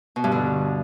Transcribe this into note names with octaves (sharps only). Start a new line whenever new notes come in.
B2
G2
D3